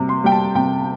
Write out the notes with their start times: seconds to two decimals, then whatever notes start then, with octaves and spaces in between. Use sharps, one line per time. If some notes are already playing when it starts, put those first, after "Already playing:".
Already playing: C3 G3
0.09 C6
0.24 G3 G5
0.32 A5
0.55 C3 G5